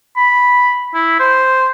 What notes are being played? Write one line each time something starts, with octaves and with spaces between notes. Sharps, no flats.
B5
E4
C5